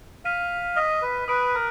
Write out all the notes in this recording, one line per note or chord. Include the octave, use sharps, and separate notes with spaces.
F5 F6 B6 D#7
D#5 F6 B6 D#7
B4
B4 D#6 F#6 D7
A#4